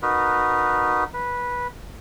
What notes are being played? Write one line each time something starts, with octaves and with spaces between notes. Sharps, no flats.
D#4 F#4 A#4 B4
B4